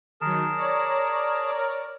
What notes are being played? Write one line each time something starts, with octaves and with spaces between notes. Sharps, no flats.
D#3 F#3 G#4 A#4 A5
C#5 D5 A#5
A#4